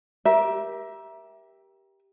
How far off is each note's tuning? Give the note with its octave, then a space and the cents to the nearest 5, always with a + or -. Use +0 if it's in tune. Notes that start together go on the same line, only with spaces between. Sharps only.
G4 +0 A#4 +30 E5 +0